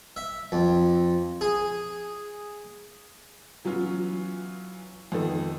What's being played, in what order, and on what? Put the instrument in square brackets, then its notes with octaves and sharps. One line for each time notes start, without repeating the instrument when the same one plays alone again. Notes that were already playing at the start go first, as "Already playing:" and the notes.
[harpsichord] E5
F2
G#4
[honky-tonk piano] E3 F#3 B3 C#4 F4
F2 D#3 B3 D#4 A4